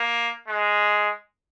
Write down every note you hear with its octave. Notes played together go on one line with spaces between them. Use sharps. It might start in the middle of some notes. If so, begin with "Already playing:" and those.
Already playing: A#3
G#3